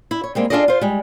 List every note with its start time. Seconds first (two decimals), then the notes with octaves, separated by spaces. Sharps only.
0.11 E4
0.24 C#5
0.35 G3 G#3 A#3 C4
0.50 D4 F4 G#4 A4 D5 D#5
0.68 F4 C5
0.81 G3 G#3